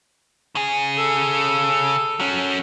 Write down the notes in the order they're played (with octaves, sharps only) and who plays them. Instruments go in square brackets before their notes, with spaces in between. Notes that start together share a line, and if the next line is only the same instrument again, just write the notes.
[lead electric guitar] C#3 G#4
[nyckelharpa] A4
[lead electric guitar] F#3 C#4